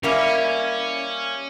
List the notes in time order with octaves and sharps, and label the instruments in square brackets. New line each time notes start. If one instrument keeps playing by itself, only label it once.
[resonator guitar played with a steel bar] G3 A#3 E4 [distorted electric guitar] C#4